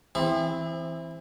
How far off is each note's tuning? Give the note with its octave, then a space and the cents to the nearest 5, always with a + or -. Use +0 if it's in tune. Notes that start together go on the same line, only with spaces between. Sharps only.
E3 +0 C4 +0 G#4 -45